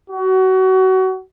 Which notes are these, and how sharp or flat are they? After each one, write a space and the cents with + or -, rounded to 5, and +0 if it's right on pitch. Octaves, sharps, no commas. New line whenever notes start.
F#4 +25